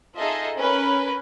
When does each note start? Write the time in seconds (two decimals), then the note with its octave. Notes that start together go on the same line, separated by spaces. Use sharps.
0.18 D#4 F4 G#4 A4 D#5 E5
0.59 C#4 A#4 B4